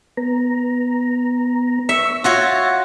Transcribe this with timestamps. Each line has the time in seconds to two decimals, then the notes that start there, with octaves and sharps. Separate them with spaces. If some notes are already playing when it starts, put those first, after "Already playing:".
0.17 B3 A#5
1.89 E5 C#6 E6
2.24 F4 F#4 C#5 E5 A6 A#6